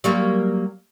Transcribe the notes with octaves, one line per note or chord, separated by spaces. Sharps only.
F#3 G3 A#3